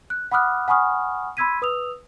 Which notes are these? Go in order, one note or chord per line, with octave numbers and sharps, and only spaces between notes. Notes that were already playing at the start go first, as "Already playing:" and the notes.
F#6
F#5 B5 D6 D#6 F6 F#6
F#5 G#5 B5 C#6 D#6 F6
B5 C6 E6 G#6 B6 D#7
B4 D#6 E6 F7